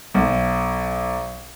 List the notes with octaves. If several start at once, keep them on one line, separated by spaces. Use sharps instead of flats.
B1